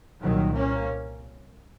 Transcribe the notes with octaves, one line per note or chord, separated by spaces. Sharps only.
C2 A#2 D#3 F#3
A#3 C#4